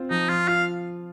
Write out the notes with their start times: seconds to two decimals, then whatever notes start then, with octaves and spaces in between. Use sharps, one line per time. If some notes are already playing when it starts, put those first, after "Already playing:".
Already playing: C4 F4 C5
0.11 F3 D#4
0.29 F3 F4
0.48 F4 F5